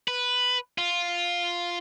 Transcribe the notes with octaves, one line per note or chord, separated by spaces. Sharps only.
B4
F4